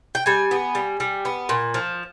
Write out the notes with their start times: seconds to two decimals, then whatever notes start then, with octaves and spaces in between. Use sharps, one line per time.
0.15 G5
0.26 G3 G#5
0.51 B3
0.75 G3
1.00 G3
1.25 B3
1.49 A#2
1.74 F3